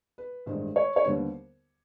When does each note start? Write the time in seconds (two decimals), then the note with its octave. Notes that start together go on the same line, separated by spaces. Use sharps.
0.18 B4
0.46 A1 G2 D#3 G#3 C5
0.76 C#5
0.96 C#5
1.04 D#2 D3 G3 B3 C5